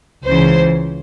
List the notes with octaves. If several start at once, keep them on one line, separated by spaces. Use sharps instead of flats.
C#2 C#3 E3 C5